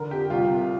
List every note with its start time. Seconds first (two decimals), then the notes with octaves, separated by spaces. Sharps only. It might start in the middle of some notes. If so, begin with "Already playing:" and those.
Already playing: D3 A#4
0.11 F2 G4
0.30 C2 F4
0.49 C3